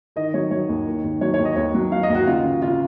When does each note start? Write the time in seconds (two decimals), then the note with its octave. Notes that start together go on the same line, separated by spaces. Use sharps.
0.16 D#3 D#5
0.34 F#3 C#5
0.51 F#3 C#5
0.69 D#2
0.86 D#3
1.04 D#2
1.21 F#3 C#5
1.34 C#5
1.39 D#2
1.45 D#5
1.56 D#2 C#5
1.74 F#3
1.92 F#3 F5
2.03 D#5
2.09 D#2
2.15 F#4
2.27 C#3 F4
2.44 C#3
2.62 C#3 F4